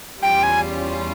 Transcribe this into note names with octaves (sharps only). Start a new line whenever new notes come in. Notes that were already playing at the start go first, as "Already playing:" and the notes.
E2 E3 G3 C#4 F4 G5
G#5